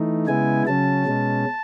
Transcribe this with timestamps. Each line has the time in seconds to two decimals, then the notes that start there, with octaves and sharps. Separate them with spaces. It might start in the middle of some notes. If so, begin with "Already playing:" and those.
Already playing: E3 A3 D#4
0.27 C#3 G#3 B3 E4 G#5
0.66 C#3 F#3 C#4 A5
1.06 B2 G#3 C#4